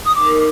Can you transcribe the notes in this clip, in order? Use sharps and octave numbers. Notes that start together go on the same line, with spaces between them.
D#6
D#4 A#4 D6